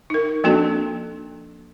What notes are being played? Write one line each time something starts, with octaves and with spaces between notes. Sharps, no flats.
D#4 A#4
F3 A#3 C4 D4 F#4 A4